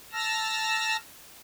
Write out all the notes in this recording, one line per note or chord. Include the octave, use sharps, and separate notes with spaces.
A5 E6 F6 A#6